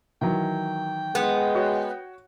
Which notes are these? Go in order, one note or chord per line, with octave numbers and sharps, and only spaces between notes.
D#3 E3 F#3 G5
G#3 B3
F#4 C#5